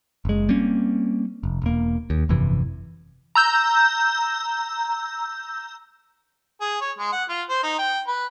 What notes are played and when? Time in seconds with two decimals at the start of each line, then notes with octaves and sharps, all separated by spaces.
0.25 F#1 G#3
0.49 G3 A#3 C4 C#4
1.43 F1
1.62 E1 A#3
2.10 D#2
2.29 G1 F2 C3 E3
3.35 A#5 E6 G6
6.61 G#4
6.81 C#5
6.99 G#3
7.13 F#5
7.29 F4
7.49 C5
7.63 D#4
7.79 G5
8.07 B4